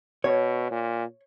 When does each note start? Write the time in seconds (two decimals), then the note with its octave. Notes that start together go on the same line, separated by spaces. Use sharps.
0.24 B2 C#5
0.71 A#2